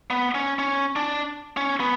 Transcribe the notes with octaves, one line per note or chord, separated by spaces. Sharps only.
B3
C#4
C#4
D4
C#4
B3